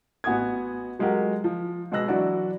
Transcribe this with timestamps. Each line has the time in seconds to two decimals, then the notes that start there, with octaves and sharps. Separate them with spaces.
0.24 A1 B3 F#4 G#5 D#6 G#6
0.99 F#3 G#3 F4 G4 A#4 F#5
1.44 F3
1.92 B2 G#3 B4 E6 F#6 A#6
2.08 E3 F#3 D4 E4 F#4 D5